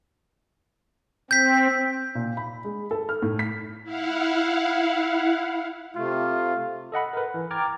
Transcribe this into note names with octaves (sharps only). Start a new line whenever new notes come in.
C4 G6 B6
A#2
B5
G#3
A4
F6
A2
B6
E4 F5 F#5
C3 A3 F4
A4 D#5 F#5 B5
A#4 B4
E3
G5 A#5 D6 F6 G#6 A6